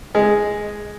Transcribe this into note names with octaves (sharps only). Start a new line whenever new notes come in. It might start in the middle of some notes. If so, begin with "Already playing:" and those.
G#3